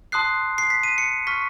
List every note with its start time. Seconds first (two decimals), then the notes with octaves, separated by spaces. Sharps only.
0.12 A5 C6 D#6 F#6 C7
0.58 C7
0.70 B6
0.83 D#7
0.98 C#7
1.27 C#6 F6 B6